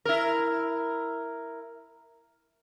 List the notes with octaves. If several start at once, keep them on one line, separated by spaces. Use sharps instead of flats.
E4 A#4